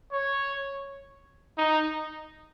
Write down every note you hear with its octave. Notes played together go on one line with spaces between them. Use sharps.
C#5
D#4